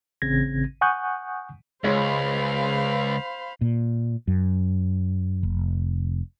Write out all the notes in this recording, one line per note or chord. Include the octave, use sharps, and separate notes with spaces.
A1 C#3 C4 G#6 A#6
F#5 G#5 C#6 D#6 F#6 G6
C#2 G#3 C5 C#5 F5 B5
A#2
F#2
F1